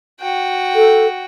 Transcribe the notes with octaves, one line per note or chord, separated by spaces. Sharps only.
F#4 G5
A4